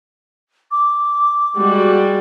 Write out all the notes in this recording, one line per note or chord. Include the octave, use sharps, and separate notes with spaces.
D6
G3 G#3 F#4